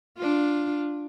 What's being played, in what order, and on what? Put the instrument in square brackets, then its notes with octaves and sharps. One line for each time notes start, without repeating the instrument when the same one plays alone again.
[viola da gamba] D4 F4